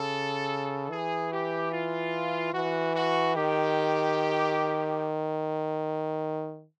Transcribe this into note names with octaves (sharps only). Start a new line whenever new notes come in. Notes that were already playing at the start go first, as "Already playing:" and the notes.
Already playing: C#3 A4
E3 G#4
G4
F4
E3 F#4
F#4
D#3 G4